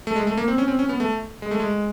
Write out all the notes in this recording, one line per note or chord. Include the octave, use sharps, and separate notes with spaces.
A3
G#3
A3
A#3
C4
C#4
C4
C#4
B3
A3
G#3
A3
G#3